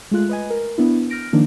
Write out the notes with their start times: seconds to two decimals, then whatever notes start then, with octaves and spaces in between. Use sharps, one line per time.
0.11 G#3 A3 F4 F#6
0.29 B4 D#5 G#5
0.50 A#4
0.78 B3 D4 E4
1.10 F6 G6 A#6 D7
1.33 D#3 F3 A#3 D4 D#4